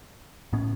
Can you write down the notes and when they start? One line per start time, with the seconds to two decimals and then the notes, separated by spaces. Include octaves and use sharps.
0.53 A2 B3 C#4